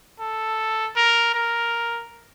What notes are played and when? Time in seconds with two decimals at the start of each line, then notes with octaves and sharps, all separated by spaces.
0.20 A4
0.96 A#4
1.34 A#4